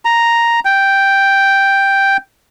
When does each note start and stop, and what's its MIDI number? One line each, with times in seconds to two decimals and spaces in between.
0.05 0.60 82
0.65 2.17 79